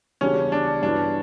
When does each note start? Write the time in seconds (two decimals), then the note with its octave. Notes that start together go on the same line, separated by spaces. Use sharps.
0.21 E2 C#3 G3 C#4 D4 F#4
0.52 D4
0.82 G2 E3 B3 D4 F#4